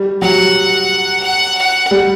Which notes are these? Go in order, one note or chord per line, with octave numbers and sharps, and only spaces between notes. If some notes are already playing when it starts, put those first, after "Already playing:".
Already playing: G3
F#3 F#5
F#5
F#5
G3